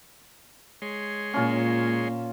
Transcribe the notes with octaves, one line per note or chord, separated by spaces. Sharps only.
G#3 C#5 C6
A#2 C#4 F4